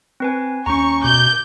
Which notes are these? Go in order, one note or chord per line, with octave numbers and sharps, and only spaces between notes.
C4 B4 G#5
D#2 C#4 A#5 C#6
B2 D6 G6